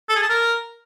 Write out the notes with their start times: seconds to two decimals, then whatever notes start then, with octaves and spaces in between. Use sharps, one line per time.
0.09 A4
0.16 G#4
0.23 A5
0.29 A#4